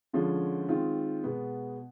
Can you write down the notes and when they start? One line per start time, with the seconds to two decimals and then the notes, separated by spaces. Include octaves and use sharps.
0.13 D3 F3 G#3 C#4 F4
0.68 D#3 G#3 C4 F4
1.24 B2 G#3 B3